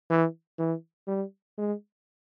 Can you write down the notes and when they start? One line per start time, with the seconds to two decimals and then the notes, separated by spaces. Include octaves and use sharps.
0.10 E3
0.59 E3
1.08 G3
1.58 G#3